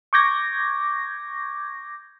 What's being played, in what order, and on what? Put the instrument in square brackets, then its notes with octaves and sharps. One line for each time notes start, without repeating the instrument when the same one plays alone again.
[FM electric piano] C#6 D6 G6 G#6 A#6